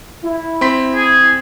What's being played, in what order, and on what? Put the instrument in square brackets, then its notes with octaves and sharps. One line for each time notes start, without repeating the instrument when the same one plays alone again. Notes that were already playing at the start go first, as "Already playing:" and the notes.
[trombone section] E4
[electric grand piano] C4 C6 B6
[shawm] G#4